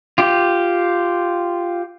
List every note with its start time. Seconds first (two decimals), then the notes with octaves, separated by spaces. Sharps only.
0.18 F4 G4